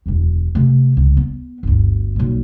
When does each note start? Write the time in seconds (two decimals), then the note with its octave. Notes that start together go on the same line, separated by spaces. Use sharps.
0.06 E1 D2
0.55 C3 A3
0.97 C#2
1.17 B3
1.63 G1 D2
2.16 B1 A#2